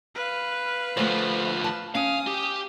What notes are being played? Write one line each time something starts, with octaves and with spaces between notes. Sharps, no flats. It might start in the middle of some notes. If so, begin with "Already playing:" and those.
B4 F5
D2 F3 A3 C5
A5
C#4 F5 D#6
G4